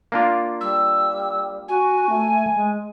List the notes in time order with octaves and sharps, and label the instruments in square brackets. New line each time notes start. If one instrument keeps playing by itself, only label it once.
[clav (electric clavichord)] A#3 D4 F4
[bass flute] G3 [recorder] E6
[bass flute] F#4 [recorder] G#5
[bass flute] A3
G#3